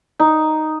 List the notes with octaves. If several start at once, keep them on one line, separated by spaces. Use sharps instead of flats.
D#4